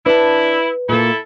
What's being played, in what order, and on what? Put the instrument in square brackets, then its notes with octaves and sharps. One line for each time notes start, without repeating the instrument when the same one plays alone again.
[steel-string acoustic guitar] D4 A5 [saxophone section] E4 [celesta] B4
[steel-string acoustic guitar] A#2 A#3 [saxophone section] E4 A4